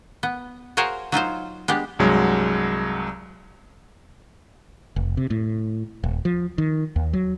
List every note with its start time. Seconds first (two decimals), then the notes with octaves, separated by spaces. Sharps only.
0.23 B3
0.77 F#4 G#4 A#4 C5 C#5 F5
1.12 F#3 D#4 F4 C5
1.68 G#3 B3 D4 G4
1.99 C2 G2 F#3 G#3
4.96 F1
5.17 C3
5.30 A2
6.04 D#1
6.25 F3
6.58 D#3
6.96 D#2
7.13 F#3